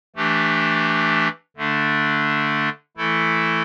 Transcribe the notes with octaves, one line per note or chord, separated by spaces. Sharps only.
E3 A3 D4 G4
D3 A3 D4
E3 A3 E4 A4